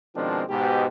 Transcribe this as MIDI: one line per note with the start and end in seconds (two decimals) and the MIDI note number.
0.15 0.42 47
0.15 0.42 51
0.15 0.42 53
0.15 0.42 56
0.15 0.42 60
0.15 0.42 62
0.49 0.86 44
0.49 0.86 47
0.49 0.86 67